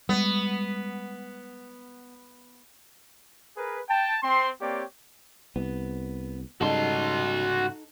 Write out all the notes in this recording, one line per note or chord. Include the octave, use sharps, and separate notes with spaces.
G3 G#3 B3
G#4 A#4 B4
G5 A5
C4 C6
A#3 C4 G4 C#5 D5
C2 B3
G#2 C#3 G3 D#4 F#4 A4 C6